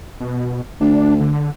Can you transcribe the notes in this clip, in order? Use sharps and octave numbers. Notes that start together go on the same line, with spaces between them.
B2
D2 D4
D3